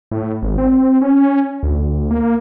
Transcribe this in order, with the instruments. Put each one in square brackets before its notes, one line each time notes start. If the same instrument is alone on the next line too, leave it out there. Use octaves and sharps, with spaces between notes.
[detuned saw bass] A2
G#1
C4
C#4
D2
A#3